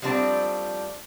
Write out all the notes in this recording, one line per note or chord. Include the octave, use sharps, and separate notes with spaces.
F3 G3 A3 C4 D4